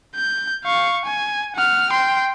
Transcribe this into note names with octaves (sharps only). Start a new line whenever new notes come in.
G6
F5 C#6
G#5
F#5 F6
G5 C6